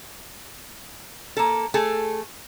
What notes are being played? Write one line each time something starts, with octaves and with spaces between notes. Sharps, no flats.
A#3 A4
A3 G#4 A4